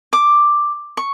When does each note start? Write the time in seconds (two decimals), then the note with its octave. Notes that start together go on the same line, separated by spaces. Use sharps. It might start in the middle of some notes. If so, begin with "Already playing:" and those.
0.13 D6
0.97 C#6